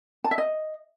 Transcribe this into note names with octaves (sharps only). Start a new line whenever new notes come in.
A5
E5
D#5